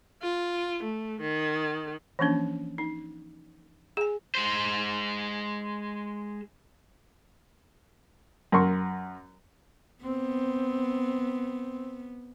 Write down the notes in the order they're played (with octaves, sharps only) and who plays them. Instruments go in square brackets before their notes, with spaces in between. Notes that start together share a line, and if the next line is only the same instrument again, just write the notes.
[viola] F4
A3
D#3
[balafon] E3 F3 A#3 C#4 D4
D#4
G#4 G#5
[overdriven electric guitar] G#3 C5
[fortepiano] F#2 A#4 C6 C#6
[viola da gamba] B3 [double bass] C4